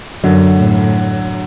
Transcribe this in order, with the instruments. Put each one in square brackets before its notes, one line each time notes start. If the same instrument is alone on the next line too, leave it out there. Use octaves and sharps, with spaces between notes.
[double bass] F#2 [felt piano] D3 F#3
[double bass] A2